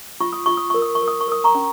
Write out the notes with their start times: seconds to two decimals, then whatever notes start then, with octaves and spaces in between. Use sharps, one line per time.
0.21 F4 C#6
0.33 D#6
0.46 F4 C#6
0.57 D#6
0.70 A#4 C#6
0.82 D#6
0.95 C#6
1.02 A#4
1.08 D#6
1.21 C#6
1.28 A#4 D#6
1.44 A#5 C#6
1.55 C#4